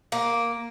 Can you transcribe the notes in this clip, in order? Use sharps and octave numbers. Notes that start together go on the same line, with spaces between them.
A#3